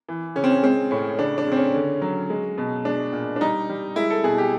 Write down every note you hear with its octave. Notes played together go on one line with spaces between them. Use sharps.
E3
C#3 C#4
C4
C#4
G#3 C4
A2 C#4
C#3 D4
D4
C#3 C4
C#4
D3
F#3
G#3
B2
G#3 D4
A#2
D4
G3 D#4
G3
G#3 E4
A4
B2 G#4
G4